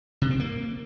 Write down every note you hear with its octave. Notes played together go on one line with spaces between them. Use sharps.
C3
C4
A#3